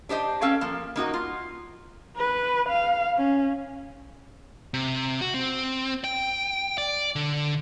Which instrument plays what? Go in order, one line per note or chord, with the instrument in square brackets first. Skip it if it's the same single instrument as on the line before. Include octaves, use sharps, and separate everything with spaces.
[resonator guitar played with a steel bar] D4 G4 C5 D#5
C#4 A4 F5 G5
F3 A#3
A#3 D#4 F#4 D#5
F4
[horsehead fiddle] B4
F5
C#4
[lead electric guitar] C3
F#4
C4
G5
D5
D3